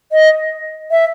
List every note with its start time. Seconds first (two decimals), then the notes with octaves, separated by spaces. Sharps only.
0.12 D#5
0.91 E5